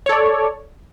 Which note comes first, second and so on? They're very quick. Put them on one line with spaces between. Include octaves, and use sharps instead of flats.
C#5 A4 D5